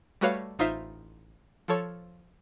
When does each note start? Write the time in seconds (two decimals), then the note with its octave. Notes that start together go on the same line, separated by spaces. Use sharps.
0.21 G3 A3 F#4 B4 C#5 F5
0.59 A1 D#4 F4 C5 E5 E7
1.68 F3 A4 C#5